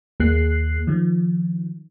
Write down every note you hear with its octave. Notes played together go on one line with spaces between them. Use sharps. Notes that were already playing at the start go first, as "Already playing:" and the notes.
D#2 A#3 G#4 F#6 C7
D#3 F3